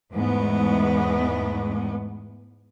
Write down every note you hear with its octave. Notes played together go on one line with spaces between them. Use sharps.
E2 G#2 A3 B3